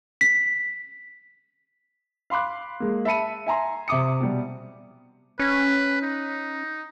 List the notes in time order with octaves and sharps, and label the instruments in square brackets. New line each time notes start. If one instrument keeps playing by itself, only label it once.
[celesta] B6
[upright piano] F5 B5 C6 D6 F#6
G#3 A#3
E5 A5 B5 C#7 D#7
E5 G#5 A#5 C6
C3 E5 D6 D#6 C#7
B2 G3
[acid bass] C#4 [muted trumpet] B4
[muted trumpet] D#4